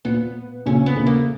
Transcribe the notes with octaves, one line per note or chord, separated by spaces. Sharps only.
A#2 B3
A#2 C#3 C#4
B3
A#2 C#3
A#3